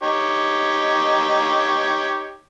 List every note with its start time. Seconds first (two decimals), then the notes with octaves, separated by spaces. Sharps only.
0.03 D#4 G4 C#5